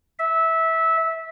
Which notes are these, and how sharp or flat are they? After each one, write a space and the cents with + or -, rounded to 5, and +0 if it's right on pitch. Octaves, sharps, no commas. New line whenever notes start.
E5 -15